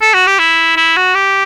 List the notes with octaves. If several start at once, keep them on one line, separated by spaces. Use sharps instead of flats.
A4
F#4
G4
E4
E4
F#4
G4